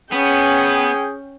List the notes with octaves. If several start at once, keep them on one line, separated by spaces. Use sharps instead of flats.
B3 C#4 G#4 G5